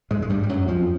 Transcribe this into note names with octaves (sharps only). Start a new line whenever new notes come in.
G#2 G#3
G#3
G2 G3
G3
F#2 F#3
F2 F3